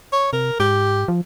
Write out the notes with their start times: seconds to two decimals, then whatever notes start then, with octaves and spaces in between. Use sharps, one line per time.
0.12 C#5
0.33 C3 A#4
0.60 G#2 G4
1.08 F3